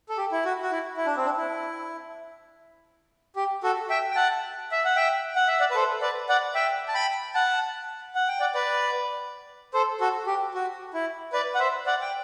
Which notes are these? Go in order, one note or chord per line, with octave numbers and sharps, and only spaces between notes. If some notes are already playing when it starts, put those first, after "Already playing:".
A4
G4
E4
F#4
F#4
E4
E4
D4
C4
D4
E4
G4
F#4 A4
E5 G5
G5
F#5 A5
E5
F#5
E5 G5
F#5
E5
D5 F#5
B4
A4 C5
B4 D5
D5 F#5
E5 G5
A5
G5 B5
F#5 A5
F#5
G5
D5 F#5
B4 D5
A4 C5
F#4 A4
G4
F#4
E4
B4 D5
F#5
C5 E5
D5 F#5
G5